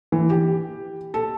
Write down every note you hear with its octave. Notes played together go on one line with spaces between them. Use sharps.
E3
G4
A4